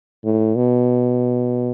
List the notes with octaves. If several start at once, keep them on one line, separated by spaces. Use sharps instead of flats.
A2
B2